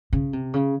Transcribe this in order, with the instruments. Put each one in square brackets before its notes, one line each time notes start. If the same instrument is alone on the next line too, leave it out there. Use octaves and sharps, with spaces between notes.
[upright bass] C#3
C3
C#3